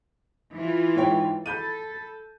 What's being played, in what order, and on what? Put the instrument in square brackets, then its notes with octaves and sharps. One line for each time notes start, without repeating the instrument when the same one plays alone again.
[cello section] E3 F4
[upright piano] G#2 C#5 G5
[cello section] A4 [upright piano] B5 G6 D#7